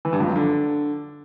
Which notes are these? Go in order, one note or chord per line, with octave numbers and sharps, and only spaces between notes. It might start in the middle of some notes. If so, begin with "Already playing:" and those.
E3
G2
F2
F#2
D3